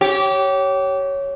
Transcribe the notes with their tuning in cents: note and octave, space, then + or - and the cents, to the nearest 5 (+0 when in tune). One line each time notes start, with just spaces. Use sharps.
G4 -25 C#5 +0